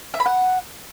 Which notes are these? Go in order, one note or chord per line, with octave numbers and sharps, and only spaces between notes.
E5
B5
F#5